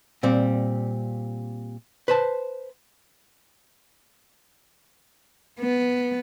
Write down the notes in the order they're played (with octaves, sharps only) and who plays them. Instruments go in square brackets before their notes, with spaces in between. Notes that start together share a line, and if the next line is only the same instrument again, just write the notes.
[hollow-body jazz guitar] A#2 G3 C4
B4 C5 A5
[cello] B3